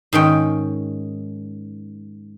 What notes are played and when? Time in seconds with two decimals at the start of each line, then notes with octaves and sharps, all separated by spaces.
0.13 G#2 D#3 C#4 G5